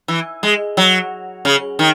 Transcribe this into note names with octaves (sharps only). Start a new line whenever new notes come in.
E3
G#3
F#3
C#3
D#3